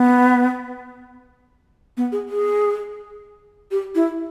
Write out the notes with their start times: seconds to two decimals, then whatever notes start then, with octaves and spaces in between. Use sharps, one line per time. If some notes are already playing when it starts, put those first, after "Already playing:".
Already playing: B3
1.97 B3
2.12 G#4
2.28 G#4
3.71 G4
3.95 E4